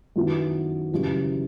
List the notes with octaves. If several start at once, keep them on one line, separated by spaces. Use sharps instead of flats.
F#2 D#3 F#3 B3 E4
F#2 C#3 E3 G3